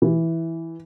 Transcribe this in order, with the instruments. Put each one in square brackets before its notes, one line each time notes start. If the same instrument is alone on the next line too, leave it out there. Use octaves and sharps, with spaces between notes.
[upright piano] E3